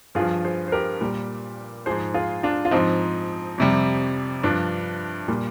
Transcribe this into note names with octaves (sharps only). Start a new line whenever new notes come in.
G2 F4 G#4
F3
G#4 C5
C5
G4 A#4
A#2 G3
G#2 F3 G#4 C5
F4 G#4
D4 F4
F4
G#2 F3 C4 D#4
F2 C3 G3
G2 F3 D4
A#2 G3